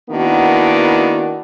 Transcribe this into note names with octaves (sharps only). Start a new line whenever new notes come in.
D#3 A#3 B3 D4 E4 F#4